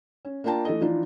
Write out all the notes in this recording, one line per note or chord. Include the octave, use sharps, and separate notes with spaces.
C#4
A#3 D4 F4 G5 A5 A#5
E3 A3 A4 D#5
E3 F3 D4 D#4 F4